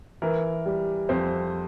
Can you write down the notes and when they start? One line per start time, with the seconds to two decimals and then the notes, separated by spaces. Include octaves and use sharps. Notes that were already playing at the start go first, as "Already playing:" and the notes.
0.22 E3 A#4
0.66 G3
1.09 F2 C5